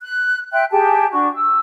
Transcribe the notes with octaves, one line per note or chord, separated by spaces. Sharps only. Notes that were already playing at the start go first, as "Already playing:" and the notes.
F#6
E5 G5 C6 F#6
G4 G#4 G5 A5
D4 F#4 C#6
E6